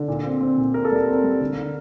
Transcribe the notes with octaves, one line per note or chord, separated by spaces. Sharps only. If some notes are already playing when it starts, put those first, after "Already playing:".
Already playing: D3
A#2
C4
C4
A#2
C4 A#4
A4
G3 A#4
C4
G3
D3
D3